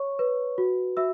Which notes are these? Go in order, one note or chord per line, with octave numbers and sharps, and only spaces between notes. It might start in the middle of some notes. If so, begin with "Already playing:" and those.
Already playing: C#5 C#6
B4
F#4
F#4 E5 E6